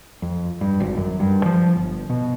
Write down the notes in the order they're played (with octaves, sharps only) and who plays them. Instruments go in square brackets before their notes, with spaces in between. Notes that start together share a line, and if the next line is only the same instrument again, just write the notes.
[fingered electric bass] F2
G2
G#1
F#2
G2
F3
G1
B2